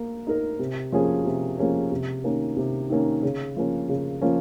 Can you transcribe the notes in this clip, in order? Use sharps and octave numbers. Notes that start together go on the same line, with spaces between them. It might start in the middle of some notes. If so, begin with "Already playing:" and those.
Already playing: A#3
D#4 A#4
C3
F3 A#3 C#4 G#4
C3
F3 A#3 C#4 G#4
C3
D#3 A#3 C#4
C3
D#3 A#3 C#4
C#3
F3 A#3 C#4
C#3
F3 A#3 C#4